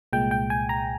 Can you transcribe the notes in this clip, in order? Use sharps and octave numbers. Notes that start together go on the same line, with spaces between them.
C2 A#2 G#3 G5
G5
G#5
A#5